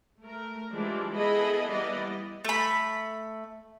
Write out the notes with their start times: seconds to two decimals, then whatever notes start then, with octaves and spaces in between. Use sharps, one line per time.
0.23 A3 A#4
0.72 E3 F3 G3 G#3 D4
1.14 B3 E4 G#4 A4 D#5 B5
1.68 E3 G3 A#3 B3 D5 D#5
2.45 A3 B5